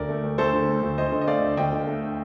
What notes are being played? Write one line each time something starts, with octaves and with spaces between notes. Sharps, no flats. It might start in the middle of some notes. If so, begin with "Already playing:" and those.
Already playing: D2 D3 A#4 D5
A3
D2
D2 A4 C5
D3
A3
D2
D2 C5 D#5
D3
D#5
A3 D5 F5
D2
D2 D#5 G5
D3
A3